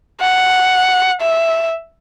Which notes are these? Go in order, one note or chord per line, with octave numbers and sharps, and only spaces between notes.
F#5
E5